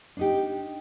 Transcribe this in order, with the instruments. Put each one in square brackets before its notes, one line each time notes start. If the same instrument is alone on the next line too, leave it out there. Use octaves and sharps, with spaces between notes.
[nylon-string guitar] D4 D#4 G4